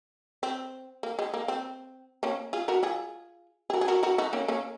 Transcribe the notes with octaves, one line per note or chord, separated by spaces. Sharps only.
C4
A#3
G#3
A#3
C4
A#3 C#4
F4 G#4
F#4 A#4
F4 G#4
G#4
F#4 A#4
G#4
F#4 A#4
F#4 A#4
D#4 F#4
A#3 C#4
A#3 C#4